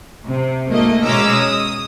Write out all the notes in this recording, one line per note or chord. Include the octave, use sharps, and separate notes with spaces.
C3
G#1 A3 A#3 D#5
B2 G#3 C#4 A#5 D6 E6
D#6